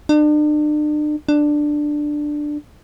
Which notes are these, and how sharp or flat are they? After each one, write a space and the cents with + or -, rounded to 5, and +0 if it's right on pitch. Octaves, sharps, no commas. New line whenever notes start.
D4 +40
D4 +10